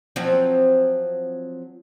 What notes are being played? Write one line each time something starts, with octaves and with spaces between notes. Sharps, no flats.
F3 F#3 C4